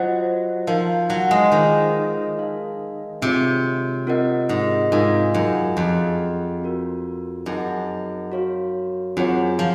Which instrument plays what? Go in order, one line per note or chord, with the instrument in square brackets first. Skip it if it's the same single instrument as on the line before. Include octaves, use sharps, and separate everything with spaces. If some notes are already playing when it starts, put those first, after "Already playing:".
Already playing: [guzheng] F#3 [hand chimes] F4 C5 D#5 F#5
[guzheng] F3 [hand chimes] D#4 A#4 F5
[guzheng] F#3
G#3
[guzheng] D#3 [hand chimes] F4 G#4 C5 F5
[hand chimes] D#4 A#4 F5 G#5
[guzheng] C3 [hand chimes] C4 F4 G#4 C#5
[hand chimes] C4 F4 A#4 D#5 F#5
[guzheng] G#2
[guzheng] G#2 [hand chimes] F4 A#4 F5 G#5
[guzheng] F#2
[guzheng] F2 [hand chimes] G#4 D#5 F#5
[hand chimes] C4 F#4 A#4
[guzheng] F#2 [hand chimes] D#4 G#4 D#5 F#5
[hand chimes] F#4 C#5 F5
[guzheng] F#2 [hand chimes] C4 F4 G#4 C#5 F#5
[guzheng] F3